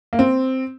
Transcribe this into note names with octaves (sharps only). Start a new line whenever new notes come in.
A#3
C4